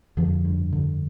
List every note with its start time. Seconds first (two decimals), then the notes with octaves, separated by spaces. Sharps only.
0.17 F2 D3 F3
0.45 G2
0.72 D3